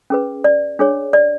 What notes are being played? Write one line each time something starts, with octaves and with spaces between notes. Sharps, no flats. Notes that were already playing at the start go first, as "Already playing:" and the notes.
C#4 G#4 B4
D5
D4 G#4 C#5
D5